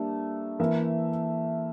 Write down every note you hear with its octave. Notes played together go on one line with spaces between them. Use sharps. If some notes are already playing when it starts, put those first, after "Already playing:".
Already playing: G3 A3 A#3 D4
E3 A#3 E4 A#4 E5